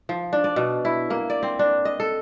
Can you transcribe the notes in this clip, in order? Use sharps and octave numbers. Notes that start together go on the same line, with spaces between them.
F3
D4
D5
B2
E4
A#3
D5
C4
D4
D#5
A4